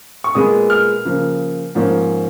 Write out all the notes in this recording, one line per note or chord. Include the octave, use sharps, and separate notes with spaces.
C#6
A#2 G#3 B3 D#6
F6
C#3 F3 A#3
G#2 F3 A#3 C#4